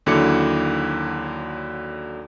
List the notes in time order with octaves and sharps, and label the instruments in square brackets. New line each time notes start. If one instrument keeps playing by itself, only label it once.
[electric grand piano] D#2 D3 F#3 E4 D6 C#7